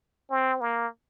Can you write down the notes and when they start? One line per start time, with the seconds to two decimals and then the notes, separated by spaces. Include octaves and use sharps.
0.30 C4
0.61 A#3